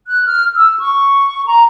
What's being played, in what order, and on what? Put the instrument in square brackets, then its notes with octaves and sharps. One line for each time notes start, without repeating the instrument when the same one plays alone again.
[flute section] F#6
F6
E6
C#6
A#5